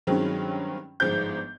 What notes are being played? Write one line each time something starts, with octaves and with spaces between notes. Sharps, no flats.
G2 D#3 F#3 G#3 C4 C#4
G1 G#2 F3 G6